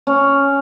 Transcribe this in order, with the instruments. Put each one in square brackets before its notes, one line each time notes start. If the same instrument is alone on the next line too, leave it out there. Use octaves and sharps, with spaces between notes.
[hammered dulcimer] C#4